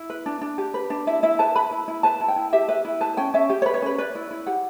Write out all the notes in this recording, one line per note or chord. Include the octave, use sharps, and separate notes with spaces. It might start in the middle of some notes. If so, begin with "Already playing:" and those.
Already playing: E4
B4
D4
D4
G4
B4
D4
E4 E5
E4 E5
B4 A5
B4 B5
E4
E4
B4 A5
E4
G5
E4
G4 E5
B4 E5
E4
B4 A5
C#4 G5
C#4 E5
G4
C#5
B4
C#5
C#4 B4
B4 D5
E4
E4
G4 F#5